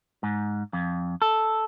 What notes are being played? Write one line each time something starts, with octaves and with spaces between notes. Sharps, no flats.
G#2
F2
A4